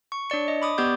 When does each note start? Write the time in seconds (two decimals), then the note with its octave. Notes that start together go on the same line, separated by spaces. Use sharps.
0.12 C#6
0.30 D4 C#5 D5 C#7
0.48 D#5
0.62 B5 D6 D#6
0.78 B3 G4 D5 D6 G6